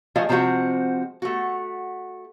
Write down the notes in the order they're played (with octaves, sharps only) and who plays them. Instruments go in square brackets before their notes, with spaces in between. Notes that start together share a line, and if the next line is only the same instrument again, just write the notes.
[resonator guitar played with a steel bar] F3 A3 F#4 G#4 D#5 F5
C3 F3 G#3 C4 F#4
A3 F#4